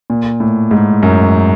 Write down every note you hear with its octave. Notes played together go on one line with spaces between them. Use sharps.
A#2
A2
G#2
F#2